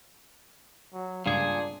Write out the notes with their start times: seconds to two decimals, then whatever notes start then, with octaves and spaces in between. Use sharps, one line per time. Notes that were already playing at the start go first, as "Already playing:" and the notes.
0.93 F#3
1.26 C#2 G2 A#2 D4 G#4 F5